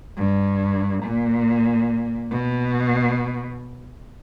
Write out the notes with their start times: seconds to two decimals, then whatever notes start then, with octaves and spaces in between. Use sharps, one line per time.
0.17 G2
1.03 A#2
2.31 B2